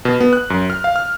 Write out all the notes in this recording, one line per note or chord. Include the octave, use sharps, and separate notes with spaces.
B2
B3
F#6
F#2
F6
F5
F6